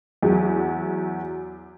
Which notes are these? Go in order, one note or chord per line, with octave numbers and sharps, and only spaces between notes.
E2 F#3